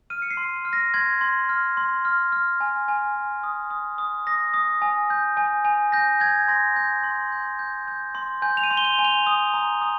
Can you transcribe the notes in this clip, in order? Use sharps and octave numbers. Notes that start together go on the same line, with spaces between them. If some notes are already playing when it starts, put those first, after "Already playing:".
F6 D#7
C#7
C7
C6
F6
A#6
C6 G#6
C6
F6
C6
F6
F6
G#5
G#5
G#5
D#6
D#6
D#6
D#6 A#6
D#6
G#5
G6
G#5
G#5
G6 A#6
G6 G#6
C6 A#6
G#5 G6
C6
G6
G6
G6
C6
G#5 G6
F7
D#7
C6
G7
F7
G#5
F7
D#6
A#5
D#6